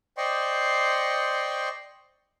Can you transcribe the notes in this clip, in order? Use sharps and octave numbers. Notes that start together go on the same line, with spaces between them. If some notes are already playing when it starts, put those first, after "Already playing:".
C5 D5 D#5 G5 C6 C#6